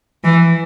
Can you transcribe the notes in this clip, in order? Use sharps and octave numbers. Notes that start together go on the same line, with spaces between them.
E3